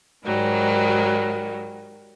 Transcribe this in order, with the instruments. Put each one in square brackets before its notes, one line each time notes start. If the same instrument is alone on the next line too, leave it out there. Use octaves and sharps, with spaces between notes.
[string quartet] G#2 D#3 F#3 G3